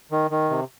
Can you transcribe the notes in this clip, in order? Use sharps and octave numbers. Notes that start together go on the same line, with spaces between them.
D#3
D#3
C3